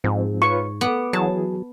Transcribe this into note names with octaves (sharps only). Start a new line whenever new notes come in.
G#2 F3 C4
F4 B4 C#5 C#6
B3 D6
E3 F#3 G#4 A5